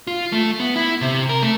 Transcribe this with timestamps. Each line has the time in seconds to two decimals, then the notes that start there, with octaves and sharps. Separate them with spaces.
0.07 F4
0.32 A3
0.60 B3
0.76 E4
1.01 C3
1.29 A#4
1.43 A3